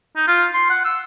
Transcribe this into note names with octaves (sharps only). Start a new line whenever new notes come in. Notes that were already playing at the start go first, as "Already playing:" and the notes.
D#4
F4
C6
F#5
E6